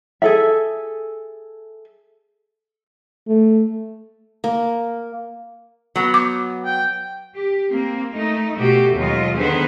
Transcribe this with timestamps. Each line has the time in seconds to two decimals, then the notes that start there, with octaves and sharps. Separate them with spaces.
0.22 G#4 A4 E5
3.28 A3
4.44 A#3
5.96 F#3 B3
6.14 D6
6.65 G5
7.36 G4
7.70 A#3 C4
8.13 A3 D#4
8.58 B2 A3 F#4 G4
8.95 D#2 B2 F#3 G#3 F4 D#5
9.36 D3 D#3 B3 G#4 B4 C5